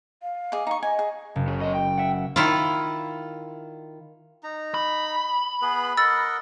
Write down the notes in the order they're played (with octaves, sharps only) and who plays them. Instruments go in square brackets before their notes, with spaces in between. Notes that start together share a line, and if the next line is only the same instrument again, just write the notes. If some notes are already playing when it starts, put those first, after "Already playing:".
[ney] F5
[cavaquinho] G#4 D#5 D6
D#4 C#6
[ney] D#5 [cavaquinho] G#5
[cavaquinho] G#4
[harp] F#1
[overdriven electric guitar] C#3
F#3 D#5
G5
[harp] E5 F#5
[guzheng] D#3 E4 F4
[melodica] D#4 A#5
[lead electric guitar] B5
[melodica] B3 G#4 B4
[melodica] A#4 D#5 F#5 [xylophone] E6 A6